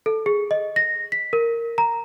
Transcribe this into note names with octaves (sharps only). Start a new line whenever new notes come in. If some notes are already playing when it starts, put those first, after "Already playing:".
A4
G#4
D#5
A#6
B6
A#4
A#5